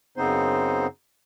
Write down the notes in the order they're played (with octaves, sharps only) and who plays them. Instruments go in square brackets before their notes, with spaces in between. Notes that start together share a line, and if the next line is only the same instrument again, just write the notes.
[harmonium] F#2 C#3 B3 C4 D#4 C5